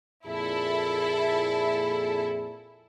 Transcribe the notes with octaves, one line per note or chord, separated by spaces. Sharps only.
F2 A#2 E4 G#4 A4